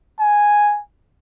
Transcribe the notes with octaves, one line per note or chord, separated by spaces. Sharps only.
G#5